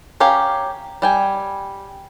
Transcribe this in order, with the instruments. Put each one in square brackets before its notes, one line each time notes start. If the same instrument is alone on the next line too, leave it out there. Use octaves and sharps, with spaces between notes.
[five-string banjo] C#4 G4 A#4 F5 A#5
G3 G5 G#5